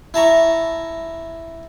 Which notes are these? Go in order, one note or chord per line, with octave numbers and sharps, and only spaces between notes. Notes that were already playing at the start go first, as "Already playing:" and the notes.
E4 A5 A#5 C#6